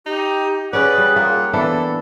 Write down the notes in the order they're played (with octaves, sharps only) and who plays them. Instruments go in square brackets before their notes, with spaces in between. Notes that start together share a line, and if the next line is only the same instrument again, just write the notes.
[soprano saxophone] D#4 [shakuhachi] G4
[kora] C#4 D5 [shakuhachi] G#4 [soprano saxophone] B4 [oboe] F#5
[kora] G3
[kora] A#3 [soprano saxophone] F4
[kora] E3 D4 E4 [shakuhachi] B3 [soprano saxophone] A4